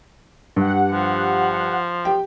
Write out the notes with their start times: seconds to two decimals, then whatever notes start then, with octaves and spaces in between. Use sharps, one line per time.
0.56 G2 G4 F#5
0.92 F3
2.05 G4 G5